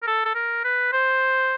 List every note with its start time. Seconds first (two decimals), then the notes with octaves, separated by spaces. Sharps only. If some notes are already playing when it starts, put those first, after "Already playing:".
0.03 A#4
0.07 A4
0.25 A4
0.35 A#4
0.64 B4
0.93 C5